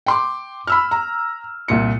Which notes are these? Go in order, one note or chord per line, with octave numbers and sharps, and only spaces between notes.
G5 C6 D6
B5 E6 F6
A#5
C2 A#2 C#7